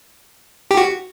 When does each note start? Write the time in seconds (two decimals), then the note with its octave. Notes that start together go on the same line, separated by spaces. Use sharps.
0.71 G4
0.77 F#4